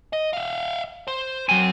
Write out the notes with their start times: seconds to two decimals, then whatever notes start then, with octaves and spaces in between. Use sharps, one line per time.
0.13 D#5
0.33 E5 F5
1.07 C5
1.49 F#3 C4 G#5